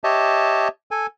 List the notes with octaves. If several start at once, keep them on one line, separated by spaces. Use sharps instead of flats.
G4 C#5 D#5 E5 A5
A4 G#5